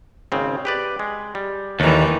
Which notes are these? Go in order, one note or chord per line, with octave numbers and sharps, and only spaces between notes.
G#1 C#3 C4
G4 B4 D5
G#3
G3
D#2 D#3 E3 G3 A3